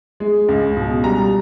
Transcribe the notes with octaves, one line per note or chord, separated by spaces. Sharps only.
G#3
C#2
B2
G3 A#5